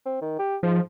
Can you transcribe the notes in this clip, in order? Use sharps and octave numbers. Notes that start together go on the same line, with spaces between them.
C4
D#3
G4
G#2 F3